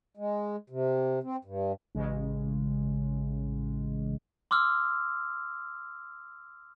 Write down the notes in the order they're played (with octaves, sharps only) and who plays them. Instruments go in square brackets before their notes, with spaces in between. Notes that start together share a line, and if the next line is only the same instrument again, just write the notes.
[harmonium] G#3
C3
C4
G2
[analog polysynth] A1 C#3 G#3
[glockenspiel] C6 D6 E6 F6